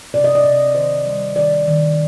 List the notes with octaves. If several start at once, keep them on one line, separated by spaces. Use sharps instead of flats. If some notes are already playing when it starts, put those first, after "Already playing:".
C3 D5
D#5
D5
C3
D#3 C5
G3
D#3 D5
D#3